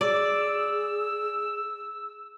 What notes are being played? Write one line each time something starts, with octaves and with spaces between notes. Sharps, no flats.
G#4 D5 E6